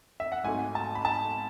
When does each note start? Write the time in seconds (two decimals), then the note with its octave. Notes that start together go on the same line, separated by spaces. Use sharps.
0.20 E5
0.32 F#5
0.44 G#1 G#2 F#3 A3 G#5
0.75 A5
0.95 B5
1.05 A5